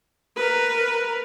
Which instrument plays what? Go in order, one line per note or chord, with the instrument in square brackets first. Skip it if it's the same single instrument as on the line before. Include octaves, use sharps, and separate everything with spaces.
[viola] A#4 B4